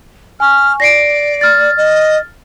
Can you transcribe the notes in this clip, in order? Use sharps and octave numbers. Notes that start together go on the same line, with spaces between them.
G#5 C#6 F6
D5 A#6 C7 D7
F6 A6
D#5